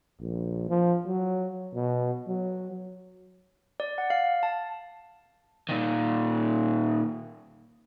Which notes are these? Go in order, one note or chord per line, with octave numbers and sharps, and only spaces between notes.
A#1
F3
F#3
B2
F#3
D5
F#5
F5
A5
A#2 D#3